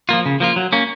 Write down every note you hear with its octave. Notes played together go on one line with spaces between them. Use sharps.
F3 A#3 F4
C#3
F3 A#3 F4
F#3
A#3 C#4